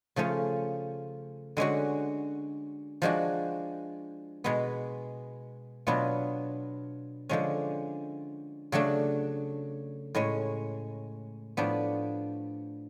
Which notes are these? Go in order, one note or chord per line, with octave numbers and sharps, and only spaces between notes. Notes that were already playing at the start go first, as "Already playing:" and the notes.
C#3 F3 A3 C#4 F4
D3 G#3 C#4 F#4
F3 G#3 D4 F#4
B2 G#3 B3
B2 F#3 B3 D4 F4
D3 F3 G#3 C#4
C#3 F#3 A3 D4
A2 G#3 C#4
A2 F3 B3 D4